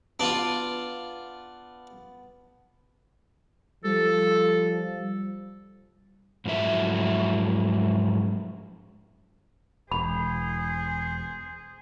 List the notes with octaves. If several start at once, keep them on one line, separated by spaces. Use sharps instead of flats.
B3 D4 F4
F3 G3 A4
G#2 F3 F#3 A3 E4 E5
E1 G#4 C5 B5